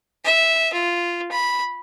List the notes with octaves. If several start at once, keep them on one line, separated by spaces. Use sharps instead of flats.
E5
F4
B5